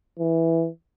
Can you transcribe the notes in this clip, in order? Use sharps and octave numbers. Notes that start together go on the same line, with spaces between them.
E3